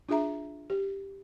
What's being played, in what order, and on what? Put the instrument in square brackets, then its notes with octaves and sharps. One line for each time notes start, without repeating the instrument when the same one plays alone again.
[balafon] D4 F4 G#4 E5 A#5
G4